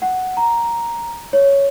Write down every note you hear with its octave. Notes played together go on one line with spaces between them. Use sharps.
F#5
A#5
C#5